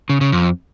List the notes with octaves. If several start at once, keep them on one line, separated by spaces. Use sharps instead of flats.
C#3
C#3
F2